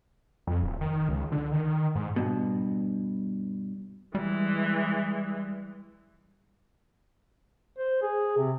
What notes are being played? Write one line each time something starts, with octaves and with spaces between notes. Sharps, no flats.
F2
D1
D#3
C#2
D3
D#3
G#2
G2 B2
E3 G3 G#3
C5
G#4
C3